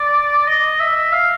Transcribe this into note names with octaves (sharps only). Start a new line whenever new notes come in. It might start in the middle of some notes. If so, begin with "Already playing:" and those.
Already playing: D5
D#5
E5
F5